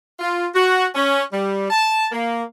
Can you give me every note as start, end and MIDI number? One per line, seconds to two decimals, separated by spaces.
0.20 0.47 65
0.54 0.86 66
0.94 1.23 61
1.33 1.68 55
1.70 2.07 81
2.12 2.42 58